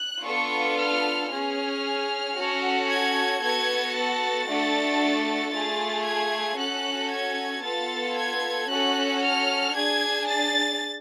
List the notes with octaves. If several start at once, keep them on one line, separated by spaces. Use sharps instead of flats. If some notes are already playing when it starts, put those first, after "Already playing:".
Already playing: F#6
B3 D4 F4 A4 C#6
F6
C#4 G#4 F6
C#4 F#4 A4
G#6
B3 F#4 A4 G#6
A6
A3 D4 F#4 A4
A3 F4 G#4 A6
G#6
C#4 F#4 A4 F#6
G#6
B3 F4 A4 A6
G#6
C#4 F#4 A4 F#6
F6
D4 G#4 G#6
A6